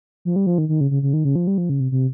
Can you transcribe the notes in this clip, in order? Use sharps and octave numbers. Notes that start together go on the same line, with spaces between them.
F3
G3
F3
D#3
D#3
C#3
C#3
C#3
D#3
C#3
F3
G3
F3
C#3
C3
C3